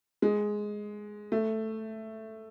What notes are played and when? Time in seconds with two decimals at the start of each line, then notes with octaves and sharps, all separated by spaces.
0.22 G#3
1.32 A3